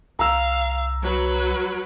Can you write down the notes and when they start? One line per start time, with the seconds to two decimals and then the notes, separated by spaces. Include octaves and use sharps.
0.19 C2 F5 A#5 E6
1.03 F#3 B4